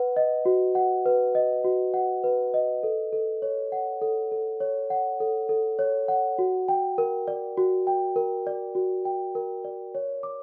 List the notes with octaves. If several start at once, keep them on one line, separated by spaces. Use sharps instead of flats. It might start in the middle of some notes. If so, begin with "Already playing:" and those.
Already playing: B4 F#5
D#5
F#4
F#5
B4
D#5
F#4
F#5
B4
D#5
A4
A4
C#5
F#5
A4
A4
C#5
F#5
A4
A4
C#5
F#5
F#4
G5
A#4
D5
F#4
G5
A#4
D5
F#4
G5
A#4
D5
C#5
D6